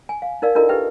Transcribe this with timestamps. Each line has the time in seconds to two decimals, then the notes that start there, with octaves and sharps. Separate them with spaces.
0.09 G#5
0.22 F5
0.42 D#4 A#4 D5 F5
0.55 D4 E4 F4 A4 A#4 D#5
0.69 D#4 G4 B4 E5 G5